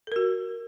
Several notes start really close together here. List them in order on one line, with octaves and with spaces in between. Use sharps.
A4 A#4 F#4